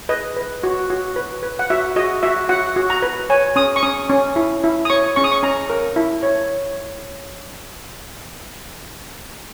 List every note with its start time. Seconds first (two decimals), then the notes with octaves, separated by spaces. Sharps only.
0.09 B4 D#5
0.37 B4
0.63 F#4
0.90 F#4
1.16 B4
1.43 B4
1.59 F#5
1.70 F#4 E5
1.96 F#4 D#5
2.23 F#4 E5
2.49 F#4 F#5
2.76 F#4
2.90 A#5
3.02 B4
3.30 C#5 G#5
3.56 C#4 D#6
3.76 C#6
3.83 C#4 D#6
4.09 C#4
4.36 E4
4.64 E4
4.85 D#6
4.90 C#5 C#6
5.16 C#4 C#6
5.24 D#6
5.32 C#6
5.43 C#4 A#5
5.70 A#4
5.96 E4
6.23 C#5